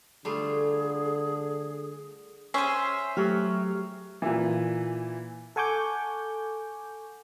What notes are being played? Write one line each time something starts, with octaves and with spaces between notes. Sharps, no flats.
D3 G3 A3 F4 G#4
C#4 G#4 C5 E5 C7
F#3 A3 G4 F6
A#2 E3
A4 F#5 G#5 C#6 D6 G6